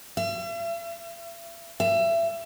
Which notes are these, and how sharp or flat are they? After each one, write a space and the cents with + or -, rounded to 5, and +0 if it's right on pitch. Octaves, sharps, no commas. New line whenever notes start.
E5 +45
E5 +30